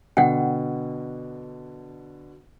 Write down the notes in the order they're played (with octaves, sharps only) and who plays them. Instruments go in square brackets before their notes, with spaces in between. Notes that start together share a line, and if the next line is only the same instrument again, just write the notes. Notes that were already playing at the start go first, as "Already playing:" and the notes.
[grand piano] B2 D3 [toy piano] F#5 G5